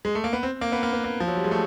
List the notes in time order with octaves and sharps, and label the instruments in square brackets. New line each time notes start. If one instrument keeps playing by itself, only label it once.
[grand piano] G#3
A3
A#3
B3
C4
A#3
B3
A#3
B3
A#3
F3
F#3
G3
G#3
A3